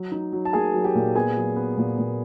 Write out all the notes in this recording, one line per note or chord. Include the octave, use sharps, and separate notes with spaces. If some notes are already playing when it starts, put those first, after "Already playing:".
Already playing: F#3
D#4
F#3
A5
A#3 G#4 G#5
F#3
G4 G5
A#2
B3 G#4 G#5
F#3
B3
A#2
A#2